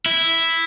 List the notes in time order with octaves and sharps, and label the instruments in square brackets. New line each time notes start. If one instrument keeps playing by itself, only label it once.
[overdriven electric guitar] E4